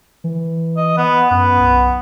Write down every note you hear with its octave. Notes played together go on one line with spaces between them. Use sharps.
E3
D#5
B3
F#2 B3
B1